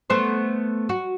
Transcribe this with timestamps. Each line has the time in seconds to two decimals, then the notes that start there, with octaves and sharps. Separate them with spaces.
0.10 A3 B3 C5
0.89 F#4